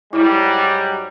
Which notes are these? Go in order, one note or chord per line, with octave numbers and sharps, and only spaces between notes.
G#2 F#3 G3 E4